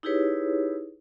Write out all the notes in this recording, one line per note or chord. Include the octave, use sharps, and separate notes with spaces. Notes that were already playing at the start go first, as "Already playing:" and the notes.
D#4 E4 G4 G#4 B4 C#5